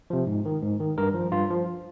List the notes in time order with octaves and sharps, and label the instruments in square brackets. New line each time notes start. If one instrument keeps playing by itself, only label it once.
[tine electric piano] C3 F3
G#2
D#3
G#2
D#3
G2 A#4
F3
G2 F4
F3